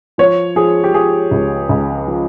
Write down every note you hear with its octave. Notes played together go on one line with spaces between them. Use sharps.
F3 C#5
F3 G#4
G4
F3 G#4
C#2
C#2
F3